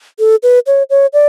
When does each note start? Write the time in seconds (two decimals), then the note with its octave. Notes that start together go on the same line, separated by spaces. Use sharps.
0.19 A4
0.43 B4
0.67 C#5
0.90 C#5
1.13 D5